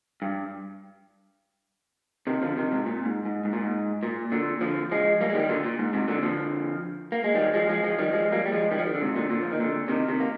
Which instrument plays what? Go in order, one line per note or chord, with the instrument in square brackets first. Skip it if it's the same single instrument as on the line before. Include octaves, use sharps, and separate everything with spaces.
[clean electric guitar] G2
C3 D#3
D3 F3
C3 D#3
G#2 C3
A#2
G#2
G#2
G#2
A#2
G#2
A#2
A#2 D3
D3 F3
F3 G#3
G3 A#3
G#3
D#3 G3
A#2 D3
A#2
G#2
G#2 C3
A#2 D3
D3 F3
A#3
G#3
D#3 G3
F3 G#3
F3 G#3
F3 G#3
D#3 G3
F3 G#3
G3 A#3
G3
F3 G#3
D#3 G3
F3
D#3
D3
G#2 C3
A#2 D3
A#2 D3
F3
D#3
A#2 D3
C3 D#3
C3 D#3
A#3